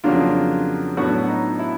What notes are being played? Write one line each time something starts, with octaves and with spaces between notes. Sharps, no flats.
F2 C#3 F#3 A#3 D4 F4
A2 F#3 B3 D4 F#4
D#4
E4